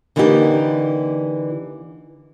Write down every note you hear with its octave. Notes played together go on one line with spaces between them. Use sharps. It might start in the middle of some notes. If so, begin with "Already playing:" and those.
D3 E3 A#3 C#4 D#4 G4